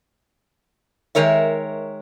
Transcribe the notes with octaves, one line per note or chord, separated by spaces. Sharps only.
D#3 G#3 A#4 C#5 E5